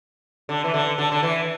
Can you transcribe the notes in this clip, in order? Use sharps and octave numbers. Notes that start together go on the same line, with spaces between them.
D3
E3
D3
D3
D3
E3